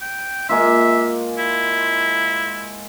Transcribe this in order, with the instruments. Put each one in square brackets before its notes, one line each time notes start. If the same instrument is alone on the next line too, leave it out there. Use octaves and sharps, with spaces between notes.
[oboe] G5
[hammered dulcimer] G#3 A#3 F4 [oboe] E5
[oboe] E4